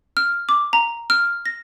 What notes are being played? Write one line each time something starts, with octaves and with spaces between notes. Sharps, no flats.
F6
D6
A#5
F6
A#6